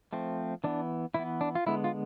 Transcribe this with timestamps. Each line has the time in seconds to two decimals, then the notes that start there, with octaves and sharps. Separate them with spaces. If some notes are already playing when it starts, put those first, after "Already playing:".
0.13 F3 A3 C4
0.64 E3 B3 D4
1.14 E3 B3 E4
1.41 D4
1.55 F4
1.66 D3 G#3 B3 E4
1.84 F4